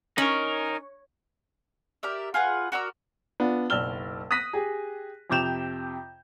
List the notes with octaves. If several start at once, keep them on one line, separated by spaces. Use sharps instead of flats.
C#4 D#4 A#4
G4 A#4 D5 E5
F4 G#4 B4 F#5
F#4 A#4 D5 E6
B3 D4 F4
F#1 B1 D5 E6 F6 G7
D#6 F#6 A#6 B6 D#7
G4 G#4
F2 C3 D6 G6 E7 F7